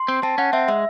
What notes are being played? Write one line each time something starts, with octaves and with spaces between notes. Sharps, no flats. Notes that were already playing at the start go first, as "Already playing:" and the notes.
Already playing: C6
C4
C4 A5
C#4 F#5
C4 E5
G#3 E5